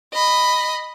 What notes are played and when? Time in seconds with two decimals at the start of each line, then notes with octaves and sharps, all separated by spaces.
0.13 D#5 B5